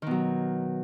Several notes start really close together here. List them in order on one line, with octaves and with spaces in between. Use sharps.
D#3 B2 F#3